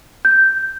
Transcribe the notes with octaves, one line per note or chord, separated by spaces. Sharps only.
G6